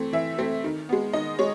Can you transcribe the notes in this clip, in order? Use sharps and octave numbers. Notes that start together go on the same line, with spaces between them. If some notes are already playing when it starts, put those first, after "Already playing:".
Already playing: E3 A3 C4
E3 E5
A3 C4
D#3
G#3 B3
D#3 D#5
G#3 C#5